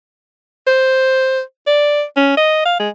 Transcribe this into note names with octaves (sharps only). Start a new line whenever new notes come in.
C5
D5
C#4
D#5
F5
G#3